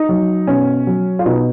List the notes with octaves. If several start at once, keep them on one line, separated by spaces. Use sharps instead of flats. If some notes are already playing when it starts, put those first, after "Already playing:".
Already playing: D#4
F#3
B2 C#4
F#3
F4
B2 D#4